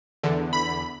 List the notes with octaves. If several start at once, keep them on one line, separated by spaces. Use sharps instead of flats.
E2 D3
B5